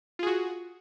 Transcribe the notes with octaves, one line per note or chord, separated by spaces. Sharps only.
F4 F#4 G#4